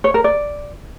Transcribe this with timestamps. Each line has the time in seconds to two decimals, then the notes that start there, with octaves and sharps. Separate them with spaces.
0.04 C#5
0.14 A#4
0.24 D5